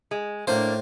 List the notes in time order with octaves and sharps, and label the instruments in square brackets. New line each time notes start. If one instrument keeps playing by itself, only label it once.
[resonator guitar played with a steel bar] G#3
[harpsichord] A2 C5 [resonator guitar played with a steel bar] A#3 D4